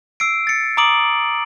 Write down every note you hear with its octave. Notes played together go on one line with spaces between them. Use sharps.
E6 C7 D7
A6 C#7
A#5 D6 D#6 D7 F#7